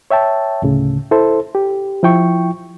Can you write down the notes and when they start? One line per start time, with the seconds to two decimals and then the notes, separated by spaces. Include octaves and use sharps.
0.11 C#5 E5 G5 A5
0.62 D2 A2 C#3
1.11 E4 A4 C5
1.55 G4
2.03 F3 E4 G5 C#6